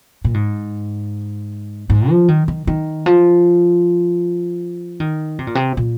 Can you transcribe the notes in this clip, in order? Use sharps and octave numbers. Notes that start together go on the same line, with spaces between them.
A#2
G#2
G#2
F3
D#3
D#3
D#3
F3
D#3
C3
A#2
C3
A#2